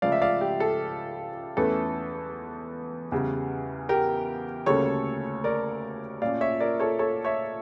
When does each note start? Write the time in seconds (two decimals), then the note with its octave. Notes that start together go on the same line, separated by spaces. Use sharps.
0.02 C#2 C#3 F3 A3 D5 F5
0.12 E5
0.22 D5 F5
0.41 G4
0.60 A4
1.57 E2 E3 A3 C#4 A4
3.12 E2 C#3 G3
3.89 G4 A#4
4.66 D2 C#3 G3 A#3 C#4 A4 C#5
5.44 A#4 D5
6.22 A#2 A3 C#4 D5 F5
6.41 C#5 E5
6.60 A#4 D5
6.80 A4 C#5
6.99 A4 C#5
7.24 C#5 E5